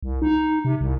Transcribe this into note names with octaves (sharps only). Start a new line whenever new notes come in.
C2
D#4
C3
C2